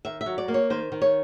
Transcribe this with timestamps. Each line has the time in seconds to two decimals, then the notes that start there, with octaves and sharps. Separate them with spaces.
0.05 D#3 E5
0.21 E5
0.26 F#3
0.38 D5
0.48 A#3
0.54 C#5
0.70 D#3 C5
0.92 D#3
1.02 C#5